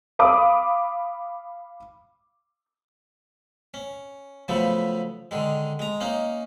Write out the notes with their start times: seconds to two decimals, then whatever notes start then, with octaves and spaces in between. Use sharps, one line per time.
0.19 F5 B5 D6 D#6
3.74 C#4
4.48 C#3 F3 F#3 A3 B3
5.31 D3 D#3 G#3
5.79 G#3 A#5
6.01 A#3 C#4 D#4